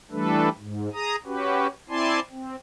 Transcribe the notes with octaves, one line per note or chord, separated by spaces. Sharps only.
E3 G3 A3 D4 A4 B4
G#2
G#4 A#5 D#6
C#4 F#4 G4 B4
C4 E4 D5 G#5 A5 C6
C4